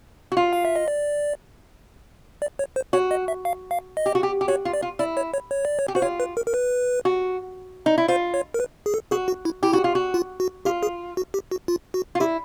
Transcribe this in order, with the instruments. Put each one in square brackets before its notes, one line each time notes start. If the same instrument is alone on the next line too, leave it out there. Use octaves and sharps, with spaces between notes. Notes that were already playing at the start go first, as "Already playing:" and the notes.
[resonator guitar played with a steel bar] F#4
F4
[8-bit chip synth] F5
E5
D#5
D5
D5
C#5
C5
[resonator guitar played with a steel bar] F#4 [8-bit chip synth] C#5
[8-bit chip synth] D#5
E5
F5
F5
D#5
[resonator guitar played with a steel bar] G4
F#4
G4
G4
[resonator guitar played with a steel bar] F#4 [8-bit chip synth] C#5
[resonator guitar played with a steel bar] F4
[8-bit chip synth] D5
[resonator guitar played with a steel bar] F4
[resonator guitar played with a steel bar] E4 [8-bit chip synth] D5
[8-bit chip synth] C#5
C#5
C#5
D5
C#5
[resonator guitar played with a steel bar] G4
[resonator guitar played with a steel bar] F#4 [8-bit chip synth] C5
[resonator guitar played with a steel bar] F4 [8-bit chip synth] C#5
[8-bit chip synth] B4
A#4
A#4
B4
[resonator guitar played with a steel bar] F#4
D#4
E4
[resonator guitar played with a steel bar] F4 [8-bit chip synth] C5
[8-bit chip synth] C#5
A#4
B4
G#4
A4
[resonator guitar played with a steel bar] F#4 [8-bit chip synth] G#4
[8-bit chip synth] F#4
E4
[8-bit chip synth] E4 [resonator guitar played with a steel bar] G4
[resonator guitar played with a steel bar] F#4
F4
F#4
[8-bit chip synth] F4
F#4
[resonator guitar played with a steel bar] F4 [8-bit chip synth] G4
[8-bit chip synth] G#4
F#4
G4
F#4
F4
F#4
[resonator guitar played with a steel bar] F4
[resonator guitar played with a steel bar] E4 [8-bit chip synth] G4